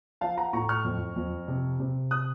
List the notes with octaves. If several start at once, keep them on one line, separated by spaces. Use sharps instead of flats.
F3 F5 A5
F#5 A#5
A2 A#5 C#6
C#6 F6
F2
F2
C3
C3
D#6 F#6